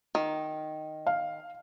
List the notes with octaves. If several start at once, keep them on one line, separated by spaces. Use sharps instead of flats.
D#3
F5